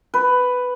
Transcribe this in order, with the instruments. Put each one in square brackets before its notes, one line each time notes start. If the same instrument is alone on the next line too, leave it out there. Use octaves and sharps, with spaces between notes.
[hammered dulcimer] B4